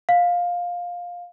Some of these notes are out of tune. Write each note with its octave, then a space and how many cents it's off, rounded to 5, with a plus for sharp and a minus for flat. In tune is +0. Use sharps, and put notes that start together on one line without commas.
F5 +15